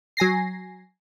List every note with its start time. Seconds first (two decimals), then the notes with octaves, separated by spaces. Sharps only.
0.17 F#3 G#5 A#6 C7